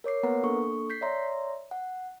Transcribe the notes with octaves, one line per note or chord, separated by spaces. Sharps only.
A#4 C#5 D6 C7
A#3 B3 A#4 B4 F#5 A#5
A#3 D4 A4 C#6
G6 B6 C7
C#5 D5 E5 A#5 C6
F#5